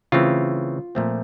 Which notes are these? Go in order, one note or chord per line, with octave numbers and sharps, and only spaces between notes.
C#3 E3 A3 C4 F4
A#2 F3 A3 C4